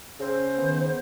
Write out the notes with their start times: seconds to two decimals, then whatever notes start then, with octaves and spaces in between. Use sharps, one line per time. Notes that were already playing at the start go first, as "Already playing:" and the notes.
0.20 C#3 C5
0.58 D#3 B3